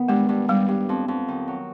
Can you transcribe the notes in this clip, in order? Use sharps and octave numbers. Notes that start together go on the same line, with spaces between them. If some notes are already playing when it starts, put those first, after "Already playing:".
Already playing: D#3 B3
G2 G#3
G2
G2 G3
G2
F2
F2
D#3
F#3